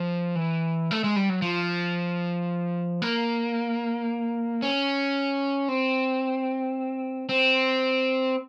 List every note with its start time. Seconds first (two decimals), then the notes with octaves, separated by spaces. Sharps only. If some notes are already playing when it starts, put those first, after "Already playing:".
Already playing: F3
0.35 E3
0.91 A3
1.04 G#3
1.16 G3
1.29 F#3
1.42 F3
3.02 A#3
4.62 C#4
5.69 C4
7.29 C4